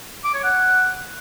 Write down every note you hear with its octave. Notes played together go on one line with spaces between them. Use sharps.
D6
C#5
F#5